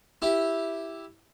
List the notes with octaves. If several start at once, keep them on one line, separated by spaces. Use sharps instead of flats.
E4 G4